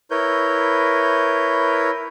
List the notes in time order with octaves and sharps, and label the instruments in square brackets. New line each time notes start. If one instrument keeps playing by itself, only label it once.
[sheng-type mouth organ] E4 A#4 B4 C#5 G6